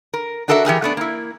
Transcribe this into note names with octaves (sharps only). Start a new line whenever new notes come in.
A#4
D4 F#4 A4 A#4 D#5 E5
E3 G4 G#4 A#4
A3 B3 D4
A#3 E4